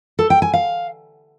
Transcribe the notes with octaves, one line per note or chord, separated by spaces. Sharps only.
A4
G5
G#5
F5